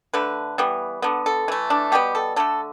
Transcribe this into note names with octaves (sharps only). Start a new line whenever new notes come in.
D3 A3 B4
E3 G3 B3
D3 B3
A4
E3 A3
D4
B2 G3 B3 G4
A4
D3 A3 A4